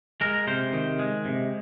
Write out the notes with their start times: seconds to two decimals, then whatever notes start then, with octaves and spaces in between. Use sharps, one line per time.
0.21 G#3 A#4
0.47 C3 C5
0.73 D#3
0.99 G#3
1.25 C3